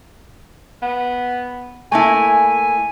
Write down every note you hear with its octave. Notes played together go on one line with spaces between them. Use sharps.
B3
A3 A#3 E4 G#5